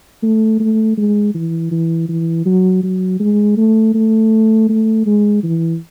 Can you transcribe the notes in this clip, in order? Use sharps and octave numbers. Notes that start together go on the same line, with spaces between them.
A3
A3
G#3
E3
E3
E3
F#3
F#3
G#3
A3
A3
A3
G#3
E3